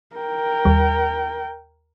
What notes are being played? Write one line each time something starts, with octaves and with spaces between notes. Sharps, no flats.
A#4 G5
D#2 G3